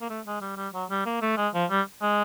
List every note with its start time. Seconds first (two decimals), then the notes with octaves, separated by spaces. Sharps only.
0.01 A#3
0.10 A3
0.26 G#3
0.41 G3
0.57 G3
0.74 F#3
0.90 G3
1.06 A#3
1.21 A3
1.37 G#3
1.54 F3
1.70 G3
2.02 G#3